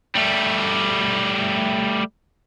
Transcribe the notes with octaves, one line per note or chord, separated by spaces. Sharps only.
G3 A3